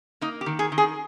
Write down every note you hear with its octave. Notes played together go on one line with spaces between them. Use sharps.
A#3 D#4
G4
D#3
G#4
D#3
G#4